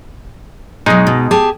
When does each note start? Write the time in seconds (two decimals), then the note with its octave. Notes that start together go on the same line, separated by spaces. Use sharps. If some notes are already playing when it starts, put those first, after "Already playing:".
0.86 B2 F#3 G#3 D#4
1.07 B2
1.31 G4 G#4 A5